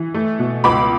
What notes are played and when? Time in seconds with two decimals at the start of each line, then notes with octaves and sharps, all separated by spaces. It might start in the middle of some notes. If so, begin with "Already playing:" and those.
Already playing: E3
0.15 A3
0.39 B2
0.64 C#2 B5 D6